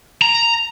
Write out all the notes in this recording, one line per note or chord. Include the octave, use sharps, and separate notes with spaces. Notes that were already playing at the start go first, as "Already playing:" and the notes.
A#5